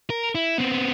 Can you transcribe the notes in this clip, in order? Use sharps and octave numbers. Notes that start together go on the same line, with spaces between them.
A#4
E4
B3 C4